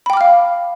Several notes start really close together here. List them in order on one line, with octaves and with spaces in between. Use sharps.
B5 G5 D6 F6 F5